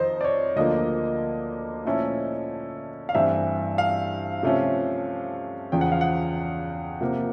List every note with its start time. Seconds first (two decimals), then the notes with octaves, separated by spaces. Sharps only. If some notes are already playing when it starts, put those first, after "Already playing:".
Already playing: F2 D#3 C5 D#5
0.21 D5
0.25 C#5
0.56 D2 D3 F3 A#3 D#5
1.85 A#2 F3 A3 C#4 E4
3.09 F5
3.14 G2 E3 A3 C4 E5
3.78 F5
4.43 C3 F3 A3 C#4
5.72 E2 C#3 F3 G5
5.81 F#5
5.92 F5
6.01 F#5
7.01 C3 F3 A#3